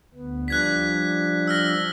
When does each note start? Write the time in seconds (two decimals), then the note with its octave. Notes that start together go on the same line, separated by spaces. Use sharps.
0.15 D2 B3
0.48 F3 G3 D4 F#6 G#6 B6
1.48 E6 F6 A#6